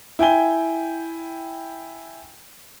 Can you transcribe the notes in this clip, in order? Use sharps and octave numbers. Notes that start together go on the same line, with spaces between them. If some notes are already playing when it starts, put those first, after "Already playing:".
E4 G5 G#5 G7